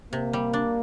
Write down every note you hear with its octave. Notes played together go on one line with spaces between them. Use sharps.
C3 A#3
G3
D4